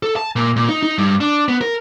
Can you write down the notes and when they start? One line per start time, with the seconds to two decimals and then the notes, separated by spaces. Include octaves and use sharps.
0.03 A4
0.16 A5
0.36 A#2
0.56 A#2
0.69 D#4
0.83 D#4
0.98 G2
1.21 D4
1.48 B3
1.61 A#4